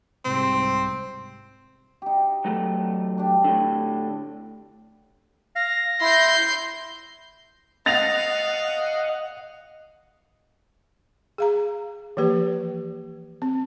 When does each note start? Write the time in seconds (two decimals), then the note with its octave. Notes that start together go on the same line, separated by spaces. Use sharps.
0.25 C2 G#2 C3 C4
2.02 D#4 G4
2.45 E3 F#3 A3
3.18 D4 G4
3.44 A2 D3
5.56 F5 A#6
6.01 E4 C6 G6
7.86 D#5 F5 F#5 A6 A#6 F7
11.38 G#4 F5 A#5
12.17 E3 F3 A#3 G4 B4
13.42 C4